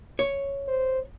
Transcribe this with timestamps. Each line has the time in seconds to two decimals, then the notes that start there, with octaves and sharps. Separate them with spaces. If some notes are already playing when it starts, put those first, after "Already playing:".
0.19 C#5
0.68 C5